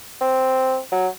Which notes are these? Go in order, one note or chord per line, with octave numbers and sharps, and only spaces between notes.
C4
F#3